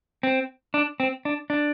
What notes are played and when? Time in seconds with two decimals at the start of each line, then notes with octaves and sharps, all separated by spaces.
0.23 C4
0.74 D4
1.00 C4
1.25 D4
1.50 D4